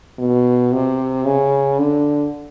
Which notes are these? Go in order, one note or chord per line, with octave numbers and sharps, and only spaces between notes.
B2
C3
C#3
D3